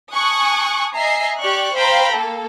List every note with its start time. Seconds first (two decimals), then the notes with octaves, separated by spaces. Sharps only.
0.13 G#5 A5 C#6 D#6 F#6
0.95 D#5 E5 G#5 A#5 C7
1.40 G4 D5 C#6 F#6
1.75 C5 F5 G5 A#5 B5
2.12 A#3 A4